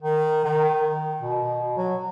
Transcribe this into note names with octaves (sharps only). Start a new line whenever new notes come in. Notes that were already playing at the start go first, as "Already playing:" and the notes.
D#3
D#3
B2
F#3